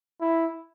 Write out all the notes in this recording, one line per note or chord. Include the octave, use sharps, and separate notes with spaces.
E4